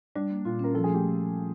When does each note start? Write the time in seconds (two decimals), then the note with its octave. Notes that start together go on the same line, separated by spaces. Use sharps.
0.15 G3 D4
0.30 A#3
0.45 A#2 F4
0.59 C#4 A#4
0.74 F3 A4
0.84 G#4
0.89 A3
0.94 G4